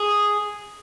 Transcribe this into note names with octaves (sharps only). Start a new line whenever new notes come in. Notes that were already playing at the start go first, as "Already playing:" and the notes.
Already playing: G#4